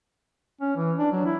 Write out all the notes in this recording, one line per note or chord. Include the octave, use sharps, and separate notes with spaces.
C#4
E3
D4
F#3
E4